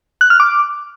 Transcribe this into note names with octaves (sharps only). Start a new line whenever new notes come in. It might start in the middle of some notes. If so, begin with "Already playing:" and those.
F#6
F6
D6